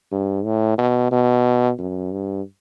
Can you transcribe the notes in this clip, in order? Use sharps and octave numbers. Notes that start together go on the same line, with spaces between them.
G2
A2
B2
B2
F#2
G2